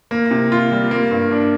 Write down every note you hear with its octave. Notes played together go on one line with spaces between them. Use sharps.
A#3
C3
F4
G3
A#3
G2
D4